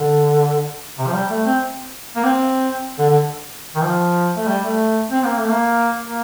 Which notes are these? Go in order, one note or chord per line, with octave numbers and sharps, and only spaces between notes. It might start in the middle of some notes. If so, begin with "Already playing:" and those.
Already playing: D3
C3
F3
G3
A3
C4
A#3
C4
D3
D3
D#3
F3
A3
G3
A3
C4
A#3
A3
A#3
A#3